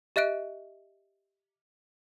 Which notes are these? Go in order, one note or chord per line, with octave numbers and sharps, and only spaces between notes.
G4 D#5 E5 F#6 D7